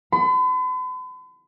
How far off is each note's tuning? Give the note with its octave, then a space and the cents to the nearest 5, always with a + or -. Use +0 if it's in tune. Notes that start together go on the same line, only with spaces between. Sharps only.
B5 +45